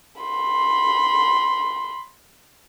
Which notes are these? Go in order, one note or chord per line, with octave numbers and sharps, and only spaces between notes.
B5 C6